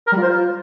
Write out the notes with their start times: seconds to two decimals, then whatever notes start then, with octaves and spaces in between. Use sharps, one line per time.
0.07 A#4
0.12 G3
0.17 F4
0.22 C5
0.28 F4